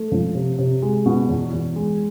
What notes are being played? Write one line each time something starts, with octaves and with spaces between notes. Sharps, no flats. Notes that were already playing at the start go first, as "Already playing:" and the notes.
Already playing: A3
F3
C3
C3
G#3
B2
E2
E2
G#3